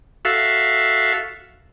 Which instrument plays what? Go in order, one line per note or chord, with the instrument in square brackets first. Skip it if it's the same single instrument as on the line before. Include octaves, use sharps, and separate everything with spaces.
[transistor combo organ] F#4 A4 E5 F5